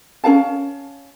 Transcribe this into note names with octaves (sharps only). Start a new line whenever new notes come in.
C#4 A#4 F5 A5